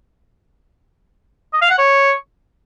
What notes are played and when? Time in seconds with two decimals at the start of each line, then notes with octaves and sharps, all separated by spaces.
1.53 D#5
1.62 F5
1.70 F#5
1.79 C#5